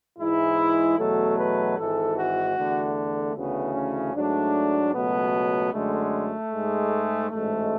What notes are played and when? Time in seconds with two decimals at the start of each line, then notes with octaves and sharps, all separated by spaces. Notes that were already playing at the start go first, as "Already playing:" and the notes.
0.19 G#2 E3 G#3 E4
0.98 E2 B2 F#3 A3 A4
1.38 B4
1.78 G#1 G#2 E3 A4
2.17 F#4
2.57 E2 D3 A3
3.35 D2 C#3 E3 A3 B3
3.74 C#4
4.15 G#2 F#3 A3 D4
4.93 C#2 B2 F#3 A3 B3
5.73 F#2 D3 G#3 A3
6.52 G#2 G#3
7.30 A1 G#2 G#3 A3